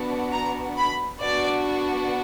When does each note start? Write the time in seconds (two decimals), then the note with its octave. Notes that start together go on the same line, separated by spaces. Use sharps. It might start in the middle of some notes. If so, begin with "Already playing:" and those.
Already playing: B3 D4 F#4
0.33 A#5
0.78 B5
1.22 B3 D4 F#4 D5